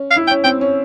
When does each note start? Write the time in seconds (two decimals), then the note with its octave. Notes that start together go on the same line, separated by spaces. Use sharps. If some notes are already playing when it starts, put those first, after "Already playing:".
Already playing: C#4
0.11 F5
0.16 E4
0.27 G5
0.30 C#4
0.44 C4 G5
0.61 C#4